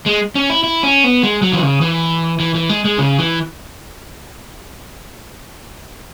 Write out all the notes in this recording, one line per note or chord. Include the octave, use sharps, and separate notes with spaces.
G#3
C#4
E4
E4
C#4
B3
G#3
F#3
E3
C#3
E3
E3
E3
G#3
G#3
C#3
E3